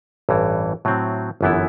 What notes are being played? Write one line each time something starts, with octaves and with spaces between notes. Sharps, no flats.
A1 G2 E3
A2 F#3 C4
G1 F#2 E3 B3 E4